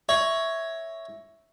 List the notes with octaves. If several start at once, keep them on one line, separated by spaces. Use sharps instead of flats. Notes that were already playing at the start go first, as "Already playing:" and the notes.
C#5 E5